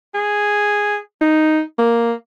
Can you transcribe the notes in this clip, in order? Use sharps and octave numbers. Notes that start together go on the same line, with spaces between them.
G#4
D#4
A#3